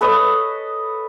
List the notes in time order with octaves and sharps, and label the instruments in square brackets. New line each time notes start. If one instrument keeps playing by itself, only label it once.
[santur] A4 B4 C#5 D#5